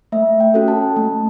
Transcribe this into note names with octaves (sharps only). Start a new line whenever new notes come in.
A3 E5
G5
C#4 F#4 A4
A5
A3